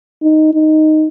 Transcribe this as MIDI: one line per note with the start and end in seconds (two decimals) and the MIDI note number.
0.22 0.53 63
0.54 1.08 63